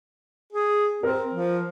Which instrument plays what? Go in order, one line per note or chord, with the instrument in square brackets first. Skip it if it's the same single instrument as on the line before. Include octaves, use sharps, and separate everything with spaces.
[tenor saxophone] G#4
[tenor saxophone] C4 [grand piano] A#4
[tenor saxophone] F3